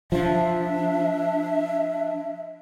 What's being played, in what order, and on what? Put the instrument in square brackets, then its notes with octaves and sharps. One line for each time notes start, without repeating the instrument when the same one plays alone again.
[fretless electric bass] F3 [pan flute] D4 [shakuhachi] E5